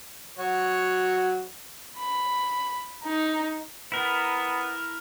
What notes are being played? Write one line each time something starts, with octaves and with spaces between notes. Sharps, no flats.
F#3 F#4 C#5
B5
D#4
B3 E4 A#4